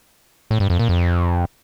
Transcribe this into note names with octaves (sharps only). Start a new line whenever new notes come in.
A2
G2
F2
A#2
F2